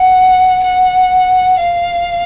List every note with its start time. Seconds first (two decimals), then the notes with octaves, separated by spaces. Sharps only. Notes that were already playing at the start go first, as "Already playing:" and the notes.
Already playing: F#5
0.64 F#5
1.59 F5